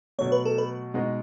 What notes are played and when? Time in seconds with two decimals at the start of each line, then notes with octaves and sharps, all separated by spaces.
0.19 B2 F#3 A3 C#5
0.32 B4
0.45 A4
0.58 B4
0.94 B2 G#3 D#4 F#4